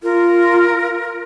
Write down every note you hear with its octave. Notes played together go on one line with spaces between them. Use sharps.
F4 A#4